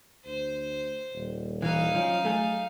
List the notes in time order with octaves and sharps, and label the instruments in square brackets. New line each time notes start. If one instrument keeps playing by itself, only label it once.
[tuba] D2 [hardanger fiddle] C5
[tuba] D#1
[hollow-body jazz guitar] E3 [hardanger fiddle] D#4 F5
[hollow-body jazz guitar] F3 C#4 [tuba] F#3
[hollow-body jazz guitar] A3 G#4